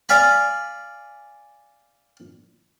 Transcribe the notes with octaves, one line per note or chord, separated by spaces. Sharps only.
D5 F5 G#5 B5